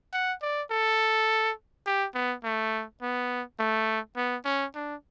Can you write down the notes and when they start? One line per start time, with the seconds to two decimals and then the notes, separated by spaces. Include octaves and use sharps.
0.13 F#5
0.42 D5
0.71 A4
1.86 G4
2.14 B3
2.44 A3
3.02 B3
3.59 A3
4.16 B3
4.45 C#4
4.75 D4